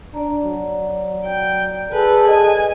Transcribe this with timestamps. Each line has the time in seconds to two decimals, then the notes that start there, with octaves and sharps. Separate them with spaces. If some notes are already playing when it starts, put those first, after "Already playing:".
0.14 D4 D5 A#5
0.43 F#3
1.25 G5
1.93 G#4 A4 B4
2.28 D#5 G#5